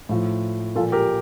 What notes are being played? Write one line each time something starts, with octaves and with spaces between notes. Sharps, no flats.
A2 F3
A#2 F3 F4 A4
G4 A#4